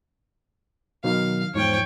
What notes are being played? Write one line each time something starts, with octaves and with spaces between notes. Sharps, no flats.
B2 D#3 F#3 F5
E2 G#2 F3 C#5 G5